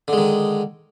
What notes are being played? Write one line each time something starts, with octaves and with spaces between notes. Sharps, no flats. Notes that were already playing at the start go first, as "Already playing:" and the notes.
D3 D#3 G#3